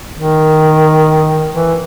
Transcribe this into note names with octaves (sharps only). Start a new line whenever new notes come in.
D#3
E3